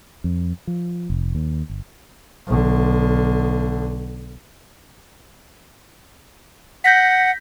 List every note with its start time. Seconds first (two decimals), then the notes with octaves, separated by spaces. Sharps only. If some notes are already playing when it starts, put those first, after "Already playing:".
0.24 F2
0.67 F3
1.10 F1
1.35 D#2
1.69 G1
2.47 B1 D3
6.84 F#5 G6 A#6 B6